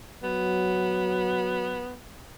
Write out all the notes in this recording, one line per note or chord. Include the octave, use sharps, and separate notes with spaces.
F#3 B3